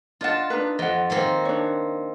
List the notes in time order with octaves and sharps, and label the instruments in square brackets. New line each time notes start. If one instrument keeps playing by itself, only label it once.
[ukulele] D4 D#5 F#5 [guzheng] F4 A5
[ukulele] D4 D#4 B4
[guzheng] F2 [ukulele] D#5 F#5
[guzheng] D#3 A#3 C4
[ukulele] D4 C#5